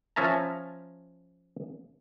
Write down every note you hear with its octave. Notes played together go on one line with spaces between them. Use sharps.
F3 C#4 E5 A5 A#5